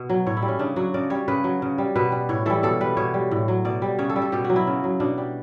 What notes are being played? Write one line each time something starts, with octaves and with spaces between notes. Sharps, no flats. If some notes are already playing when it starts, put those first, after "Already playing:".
Already playing: B2
F#3
A2 C#5
E4
G3
C#4
C#3 D4
F#3 F#4
C#3 D5
G3 C#5
C#3 B4
F#3
C#3
G3
B2 B4
G3
A2 C#5
E3 G3 A4
B2 A4
G3 B4
B2 C#5
G3
A2
F#3
B2 D5
G3
C#3 C#5
A4
G3
A4
B2 G4
F#4
F#3
E4
C#3
F#3
B2 D4
G3